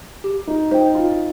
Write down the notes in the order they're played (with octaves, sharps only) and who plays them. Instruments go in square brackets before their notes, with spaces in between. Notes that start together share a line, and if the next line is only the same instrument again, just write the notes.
[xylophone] G4
[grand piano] D#4
[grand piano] D#4 [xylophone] C5 G5
[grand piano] F4